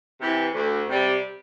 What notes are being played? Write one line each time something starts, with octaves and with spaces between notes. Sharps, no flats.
C3 E3
D2
C3 G3